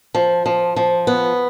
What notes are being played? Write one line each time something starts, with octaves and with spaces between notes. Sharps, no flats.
F3
F3
F3
B3